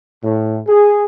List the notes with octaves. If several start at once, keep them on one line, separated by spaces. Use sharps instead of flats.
A2
G#4